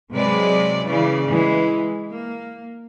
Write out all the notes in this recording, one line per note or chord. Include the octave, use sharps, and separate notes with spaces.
C3 F#3 G#3 B4 D5
C#3 E3 D5
E3 G#3
A#3